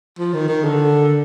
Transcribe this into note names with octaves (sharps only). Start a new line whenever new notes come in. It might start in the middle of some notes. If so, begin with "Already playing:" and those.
F3
D#3
D#3
D3